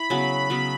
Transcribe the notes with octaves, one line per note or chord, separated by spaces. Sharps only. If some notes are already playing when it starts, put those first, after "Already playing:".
Already playing: E4 B5
C#3 F#3 B3
C#3 F#3 B3